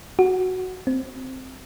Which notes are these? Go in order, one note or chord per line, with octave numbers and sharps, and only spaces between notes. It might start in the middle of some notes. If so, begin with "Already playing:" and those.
F#4
C4